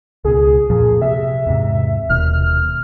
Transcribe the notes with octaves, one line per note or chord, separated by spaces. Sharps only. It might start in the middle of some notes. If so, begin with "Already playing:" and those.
C#2 B2 G#4
F2 A#2 F3
C3 E5
E2 G#2 C3
D#1 D#2 B2 F6